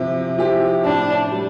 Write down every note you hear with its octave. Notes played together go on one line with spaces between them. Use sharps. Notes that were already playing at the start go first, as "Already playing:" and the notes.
Already playing: C3 F3 C4 E4 G4
F3 C4 E4 G4
A2 D4
G3